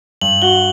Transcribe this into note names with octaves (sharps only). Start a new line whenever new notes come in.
G2 F#7
F#4 G7